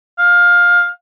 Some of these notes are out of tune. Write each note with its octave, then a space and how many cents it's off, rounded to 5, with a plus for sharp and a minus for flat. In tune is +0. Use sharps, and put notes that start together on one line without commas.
F5 +15